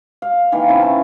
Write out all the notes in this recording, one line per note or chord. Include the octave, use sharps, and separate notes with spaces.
F5
D#3 E3 A#3
C#3 C4 E4
A5 C#6